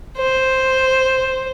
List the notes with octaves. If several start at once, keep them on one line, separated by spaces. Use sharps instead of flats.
C5